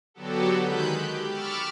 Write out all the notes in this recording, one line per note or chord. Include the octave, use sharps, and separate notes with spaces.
D3 F#3 B3 F#4 G4 A4
D#3 G#3 B4 B5 F#6 G6
G4
B5 C#6 D6 E6 F6 A6